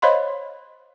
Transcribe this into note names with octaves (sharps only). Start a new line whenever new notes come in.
C5 C#5 D#5 F5 B5 C6